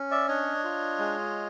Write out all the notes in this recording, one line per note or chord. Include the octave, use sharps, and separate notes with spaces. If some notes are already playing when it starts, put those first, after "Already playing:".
Already playing: C#4
D5 E5
D4 C#5 D#5
F4
G#3